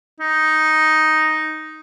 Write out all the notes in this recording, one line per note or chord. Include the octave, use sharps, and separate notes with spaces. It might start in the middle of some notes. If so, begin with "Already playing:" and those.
D#4